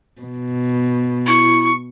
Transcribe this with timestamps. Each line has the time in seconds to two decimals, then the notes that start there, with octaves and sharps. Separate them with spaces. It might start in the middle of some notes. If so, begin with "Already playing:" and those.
0.22 B2
1.27 E4 C#6